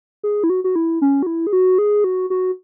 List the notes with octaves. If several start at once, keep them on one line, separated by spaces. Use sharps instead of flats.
G#4
E4
F#4
F#4
E4
C#4
F#4
E4
G#4
F#4
G#4
F#4
F#4